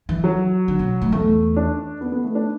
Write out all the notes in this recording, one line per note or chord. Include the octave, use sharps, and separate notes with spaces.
E3
F#3
D3
B2
A2
E2 A3
D4
B3
B3
A3
D4